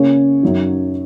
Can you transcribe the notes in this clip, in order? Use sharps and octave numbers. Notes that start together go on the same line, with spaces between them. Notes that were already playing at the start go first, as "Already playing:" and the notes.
Already playing: C#3 A#3 C#4 C#5
F#2 F#3 D#4